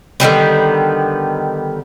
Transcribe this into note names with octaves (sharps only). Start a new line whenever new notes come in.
D3 D#3 G3 B3